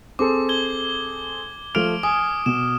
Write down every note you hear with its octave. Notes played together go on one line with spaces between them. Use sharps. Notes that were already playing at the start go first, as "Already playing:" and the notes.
C4 G#4 A4 D6
G#6 G7
F3 A3 D6 F6 D7 F7
G#5 D#6
B2 E7